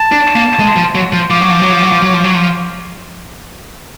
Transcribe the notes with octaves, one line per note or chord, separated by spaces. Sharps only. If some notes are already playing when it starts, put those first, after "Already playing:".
Already playing: A5
D4
A#3
G#3
F3
F#3
F3
F3 D6
F#3
F3
F#3
F3
F#3
F3
F#3
F3
F#3
F3